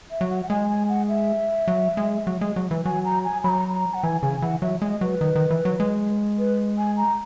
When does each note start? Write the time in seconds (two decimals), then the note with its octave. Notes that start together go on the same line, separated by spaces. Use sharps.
0.11 E5
0.21 F#3
0.30 F#5
0.43 F#5
0.50 G#3 G#5
0.69 G#5
0.89 F#5
1.08 E5
1.68 F#3
1.97 G#3
2.27 F#3
2.41 G#3
2.56 F#3
2.71 E3
2.85 F#3 G#5
3.05 A#5
3.24 G#5
3.44 F#3 A#5 B5
3.74 A#5
3.94 F#5
4.03 E3 G#5
4.22 C#3 G#5
4.42 E3 F#5
4.62 F#3 E5
4.82 G#3 D#5
5.01 F#3 B4
5.21 D#3
5.36 D#3
5.51 E3
5.65 F#3
5.80 G#3
6.38 B4
6.78 G#5
6.97 A#5